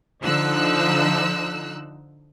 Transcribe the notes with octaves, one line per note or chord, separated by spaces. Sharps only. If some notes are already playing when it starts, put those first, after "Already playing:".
D3 F3 D#4 E6 F#6